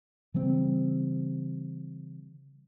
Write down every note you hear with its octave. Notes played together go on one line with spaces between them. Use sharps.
C#3 E3 G3 C4